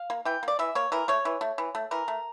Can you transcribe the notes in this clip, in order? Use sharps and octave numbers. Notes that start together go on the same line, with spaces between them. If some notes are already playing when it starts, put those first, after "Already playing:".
Already playing: F5
A#3
E3 G5
A#3
D5
E3 E5
A#3 C#5
E3 A#4
A3 C#5
E3
A3
E3
A3
E3 A#4
A3